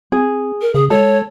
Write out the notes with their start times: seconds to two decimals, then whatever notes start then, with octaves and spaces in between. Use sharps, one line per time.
0.12 C4 G#4
0.61 A#4
0.74 C#3 G#4
0.90 G#3 A4 C#5